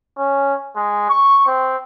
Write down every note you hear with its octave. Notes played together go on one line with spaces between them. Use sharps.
C#4
G#3
C#6
C4